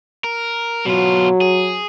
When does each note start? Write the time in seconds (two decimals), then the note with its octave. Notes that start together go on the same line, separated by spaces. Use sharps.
0.24 A#4
0.86 B2 F#3 F4
1.41 G#4